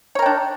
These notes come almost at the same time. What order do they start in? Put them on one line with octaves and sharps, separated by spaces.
C#5 A#4 G5 D4